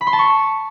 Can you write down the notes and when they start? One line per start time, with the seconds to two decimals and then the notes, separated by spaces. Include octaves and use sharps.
0.01 B5
0.07 C6
0.13 A5
0.19 C#6